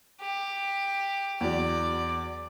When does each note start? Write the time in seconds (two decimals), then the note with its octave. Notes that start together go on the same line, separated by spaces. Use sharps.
0.21 G4
1.41 E2 F#3 D5